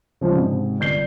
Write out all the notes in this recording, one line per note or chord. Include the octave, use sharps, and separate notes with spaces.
C#3 F3 G#3 D4
G#2 C3
G1 D5 G6 C7 G7